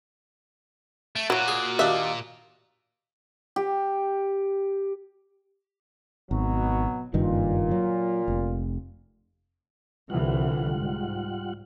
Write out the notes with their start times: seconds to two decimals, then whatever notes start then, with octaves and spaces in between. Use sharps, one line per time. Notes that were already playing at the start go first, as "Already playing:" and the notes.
1.16 A3 D7
1.30 A#2 F#3 E4 F#4
1.48 G#4
1.79 D#2 D4 E5
3.56 G4
6.31 G#1 B2 F#3
7.14 F#1 G2 A#2 D#3 F4
7.71 F#3
8.28 F1
10.10 C2 D3 E3 G3 F4 F#5
10.74 G#2